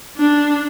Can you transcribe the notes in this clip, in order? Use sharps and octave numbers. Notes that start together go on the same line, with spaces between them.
D4